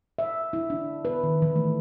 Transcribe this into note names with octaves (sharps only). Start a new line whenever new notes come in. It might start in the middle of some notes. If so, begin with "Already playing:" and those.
E5
E4
D4
B4
D#3
E3
A3